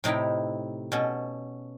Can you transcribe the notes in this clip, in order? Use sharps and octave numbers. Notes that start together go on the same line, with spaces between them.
A2 C3 D#4 E4 G5
B2 C#4 A4